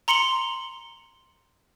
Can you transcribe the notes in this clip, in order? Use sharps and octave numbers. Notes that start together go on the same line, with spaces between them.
A#5 C6 C#7 F#7 G7